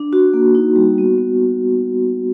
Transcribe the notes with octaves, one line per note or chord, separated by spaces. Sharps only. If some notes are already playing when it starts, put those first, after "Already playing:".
Already playing: D4
F#4
A#3
D#4
G3
B3
B3